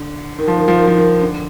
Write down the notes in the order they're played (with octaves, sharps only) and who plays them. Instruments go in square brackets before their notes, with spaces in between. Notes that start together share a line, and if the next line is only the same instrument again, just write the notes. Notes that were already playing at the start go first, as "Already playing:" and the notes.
Already playing: [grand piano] D3
D#3
F3
D#3
F3
D#3
F3
D#3
D3